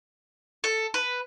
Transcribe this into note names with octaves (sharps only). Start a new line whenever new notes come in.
A4
B4